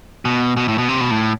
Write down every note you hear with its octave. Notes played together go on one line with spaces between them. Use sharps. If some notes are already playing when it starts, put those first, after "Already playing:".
B2
B2
A2
B2
C3
B2
A2